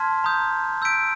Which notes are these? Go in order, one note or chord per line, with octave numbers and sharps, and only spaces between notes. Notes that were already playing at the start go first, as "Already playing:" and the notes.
Already playing: A5 C6 F6 G#6 B6
A#5 D#6 G6
E6 G6 B6 D7